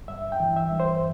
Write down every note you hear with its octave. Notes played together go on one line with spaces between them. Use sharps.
G2 E5
G5
E3
E5
G2
C5